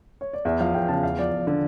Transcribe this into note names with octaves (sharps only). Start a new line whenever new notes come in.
C#5
D5
E2 E5
F3 F5
E2 G5
C#3 A5
E2 F5
F3 D5
E2
D3